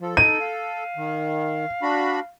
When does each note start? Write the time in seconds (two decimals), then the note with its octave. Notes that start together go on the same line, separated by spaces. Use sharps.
0.01 F3 A4
0.17 D#4 D#7
0.41 F5
0.97 D#3
1.82 D4 F#4 B5